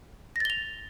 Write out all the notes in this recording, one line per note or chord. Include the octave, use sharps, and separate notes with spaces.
A6 A#6 F7 G7